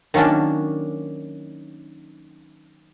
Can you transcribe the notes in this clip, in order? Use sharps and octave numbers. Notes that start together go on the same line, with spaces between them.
D#3 F#3 A#3 C#4 D4